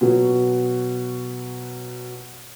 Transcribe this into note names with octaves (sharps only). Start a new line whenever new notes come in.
B2 F#3